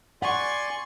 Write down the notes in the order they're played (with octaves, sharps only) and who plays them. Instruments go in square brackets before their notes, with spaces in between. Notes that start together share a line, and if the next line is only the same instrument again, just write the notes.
[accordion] D5 G#5 C6 [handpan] F#5 [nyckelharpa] C#6